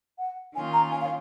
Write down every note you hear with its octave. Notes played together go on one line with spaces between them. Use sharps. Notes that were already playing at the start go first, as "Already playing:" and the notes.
F#5
D#3 A#3 C#4 F4 G#5
A#5
G#5
F5